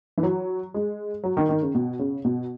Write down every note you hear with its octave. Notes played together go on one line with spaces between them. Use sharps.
E3
F#3
G#3
F#3
D#3
D#3
C#3
B2
C#3
B2